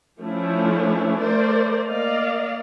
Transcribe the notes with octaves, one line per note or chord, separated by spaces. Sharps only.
F3 A3 C#4 D4 E4
A3 A#4 C5 D5
A#3 D5 D#5 F5